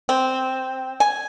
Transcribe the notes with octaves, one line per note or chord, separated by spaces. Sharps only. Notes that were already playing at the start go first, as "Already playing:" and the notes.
C4
G#5